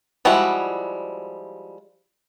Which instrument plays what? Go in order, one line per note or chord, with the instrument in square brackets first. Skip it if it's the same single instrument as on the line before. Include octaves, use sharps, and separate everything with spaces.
[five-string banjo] F3 G3 G#3 E4 F#4